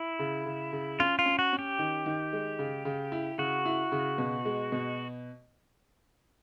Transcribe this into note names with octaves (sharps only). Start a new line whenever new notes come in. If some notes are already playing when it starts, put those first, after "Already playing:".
Already playing: E4
C#3
C#3
C#3
C#4 F4
F4
C#4
F#4
C#4
G4
D#3
D#3
G#3
C#3
C#3
E4
C#3 F#4
E4
C#3
B2
G#3
B2